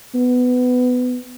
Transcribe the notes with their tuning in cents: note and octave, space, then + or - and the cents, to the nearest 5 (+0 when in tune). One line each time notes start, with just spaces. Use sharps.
B3 +15